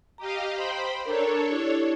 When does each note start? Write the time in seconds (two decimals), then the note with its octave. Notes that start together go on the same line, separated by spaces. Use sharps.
0.18 G4 D#5 F5 A#5
0.54 C5 G5 B5
1.06 D4 A4 A#4 C#5 A#5
1.49 E4 G4